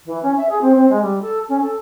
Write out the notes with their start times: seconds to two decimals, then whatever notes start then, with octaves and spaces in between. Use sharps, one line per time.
0.05 E3
0.22 C#4
0.37 E5
0.49 G#4
0.61 C4
0.76 C4
0.89 G#3
1.02 G3
1.22 A4
1.49 C#4
1.62 A4